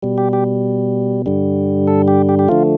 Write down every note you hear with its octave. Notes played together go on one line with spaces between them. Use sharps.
B2 G3
G4
G4
G2 D3 G3
A4
G4
G4
G4
D3 F3 A3 F4